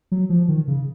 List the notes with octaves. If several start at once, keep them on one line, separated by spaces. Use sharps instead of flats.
F#3
F3
D#3
C#3